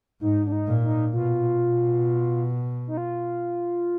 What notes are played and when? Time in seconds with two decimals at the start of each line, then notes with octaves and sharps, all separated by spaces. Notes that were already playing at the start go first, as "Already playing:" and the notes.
0.21 G#2 D#4
0.47 D4
0.52 D#4
0.68 A#2
0.83 D#4
1.13 B2 F4
1.60 B2
2.87 D#4
2.97 F4